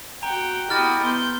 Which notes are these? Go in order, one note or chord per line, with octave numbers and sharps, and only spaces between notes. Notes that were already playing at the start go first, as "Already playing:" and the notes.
F#4 F#5 G5 A#5
E4 F#4 G4 D#5 D#6 F6 A6
B3 C6 G6